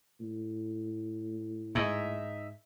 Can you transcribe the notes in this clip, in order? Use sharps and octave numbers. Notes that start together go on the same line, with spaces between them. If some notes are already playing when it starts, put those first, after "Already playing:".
A2
G#2 D#4 E5